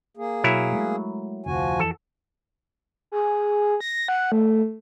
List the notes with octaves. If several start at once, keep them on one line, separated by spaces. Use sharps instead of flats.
A#3 G#4
B2 F#3 E4 A#4
G#3 A3
F1 D2 F3 F#4 G#5
F2 E3 A4
G#4
A#6
F#5
A3